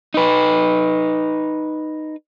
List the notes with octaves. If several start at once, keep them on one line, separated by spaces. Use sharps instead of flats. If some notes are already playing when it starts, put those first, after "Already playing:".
D#4 B4